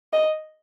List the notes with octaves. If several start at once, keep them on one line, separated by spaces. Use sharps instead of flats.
D#5